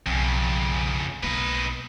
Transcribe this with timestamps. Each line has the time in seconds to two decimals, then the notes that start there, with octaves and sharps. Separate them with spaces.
0.06 B1 F2 C#3
1.23 B1 A#3 D#4 B4